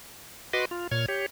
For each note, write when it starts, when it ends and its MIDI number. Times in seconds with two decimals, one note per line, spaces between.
0.53 0.65 66
0.53 0.65 71
0.53 0.65 75
0.53 0.65 84
0.53 0.65 86
0.71 0.87 65
0.91 1.06 46
0.91 1.06 73
0.91 1.06 89
0.91 1.06 92
1.08 1.26 67
1.08 1.26 73